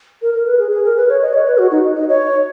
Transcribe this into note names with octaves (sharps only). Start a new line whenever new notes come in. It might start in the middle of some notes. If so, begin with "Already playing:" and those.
A#4
A#4
B4
G#4
G#4
A#4
B4
C#5
D#5
C#5
B4
F#4
D#4
D#5
C#5